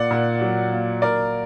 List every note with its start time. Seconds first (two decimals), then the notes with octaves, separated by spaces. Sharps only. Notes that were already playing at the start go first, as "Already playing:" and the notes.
Already playing: A#2 D5 F#5
0.11 A#2
0.41 F#3
0.72 A#3
1.02 A#3 A#4 D5